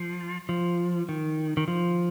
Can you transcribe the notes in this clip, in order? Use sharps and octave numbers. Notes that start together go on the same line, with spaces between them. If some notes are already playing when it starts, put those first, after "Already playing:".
Already playing: F3
F3
D#3
D#3
F3